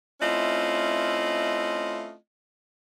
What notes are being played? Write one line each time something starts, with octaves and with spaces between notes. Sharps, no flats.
A3 C4 C#4 E4 F4 D#5